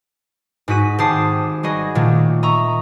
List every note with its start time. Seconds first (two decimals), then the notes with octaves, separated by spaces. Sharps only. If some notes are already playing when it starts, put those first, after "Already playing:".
0.68 G#2 D#4 F#4 B6 D#7
0.98 G#1 G4 C5 A5 D#6 C7
1.63 G3 F#4 G#4 D#5
1.95 A#2 D#3 A3
2.43 D#5 E5 A#5 C#6